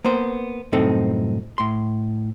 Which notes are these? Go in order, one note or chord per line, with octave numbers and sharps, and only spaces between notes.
A#3 B3 C5
C2 F#2 A2 C4 D#4 A4
A2 C6